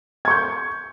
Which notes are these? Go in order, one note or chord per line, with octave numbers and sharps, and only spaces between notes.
C#6 G6 G#6